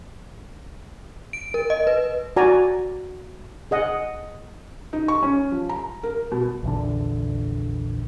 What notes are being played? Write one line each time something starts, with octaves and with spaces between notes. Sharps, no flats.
D7
A#4
D#5
B4
F#4 D5 G#5 A#5
G#4 D#5 F#5
D#4
C#6
C#4
F3
A#5
A#4
B2
A#1 E2 D3